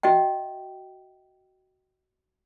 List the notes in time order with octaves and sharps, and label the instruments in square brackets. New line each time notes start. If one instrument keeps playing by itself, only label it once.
[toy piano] F#4 D#5 E5 G5